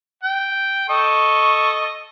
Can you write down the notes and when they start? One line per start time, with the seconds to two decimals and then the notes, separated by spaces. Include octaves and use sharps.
0.24 G5
0.90 A4 D#5 C#6